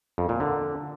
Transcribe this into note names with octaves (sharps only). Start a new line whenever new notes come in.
F2
A#2
D3